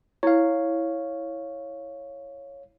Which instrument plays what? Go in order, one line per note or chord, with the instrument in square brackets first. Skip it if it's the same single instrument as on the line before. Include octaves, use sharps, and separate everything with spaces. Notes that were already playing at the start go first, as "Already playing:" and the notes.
[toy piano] E4 [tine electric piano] C#5 F5